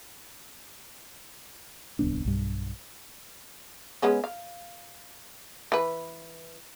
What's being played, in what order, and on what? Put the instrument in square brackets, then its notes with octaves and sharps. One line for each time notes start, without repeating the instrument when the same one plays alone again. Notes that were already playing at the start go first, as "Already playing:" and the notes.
[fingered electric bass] D1 C2 B3 D4
B1 G2
[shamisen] G#3 B3 C#4
F5
E3 B4